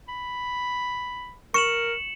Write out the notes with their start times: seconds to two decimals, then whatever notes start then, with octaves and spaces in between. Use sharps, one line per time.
0.08 B5
1.54 A#4 C#6 C#7 E7 F#7